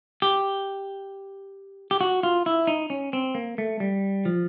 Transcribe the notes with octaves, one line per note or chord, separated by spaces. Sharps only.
G4
G4
F#4
F4
E4
D#4
C#4
C4
A#3
A3
G3
F3